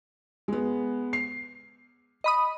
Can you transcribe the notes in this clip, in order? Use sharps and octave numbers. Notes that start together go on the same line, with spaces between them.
G#3 B3
C7
D#5 B5 D#6